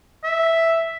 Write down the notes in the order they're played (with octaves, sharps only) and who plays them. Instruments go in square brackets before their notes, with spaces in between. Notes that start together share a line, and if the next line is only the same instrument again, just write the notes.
[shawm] E5